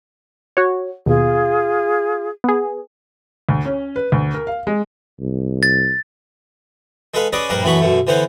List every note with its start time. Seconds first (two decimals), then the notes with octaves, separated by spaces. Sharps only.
0.57 F#4 C#5
1.06 D#2 B2 F4 G#4
2.44 B3 G#4
3.49 D2
3.65 C#4
3.96 B4
4.12 D2
4.34 A#4
4.47 F5
4.67 G#3
5.20 C2
5.63 A6
7.14 G#3 A4 B4 F5
7.33 C#4 G#4 B4 D5 D#5
7.50 A#1 G2 G3 A#4 B4
7.63 F#2 E3 A3 B3 B5 C#6
7.81 F#2 B2 A3
8.07 D3 E3 B3 B4 C5